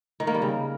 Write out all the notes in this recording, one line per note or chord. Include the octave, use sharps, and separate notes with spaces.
D#3
A#3
G3
C#3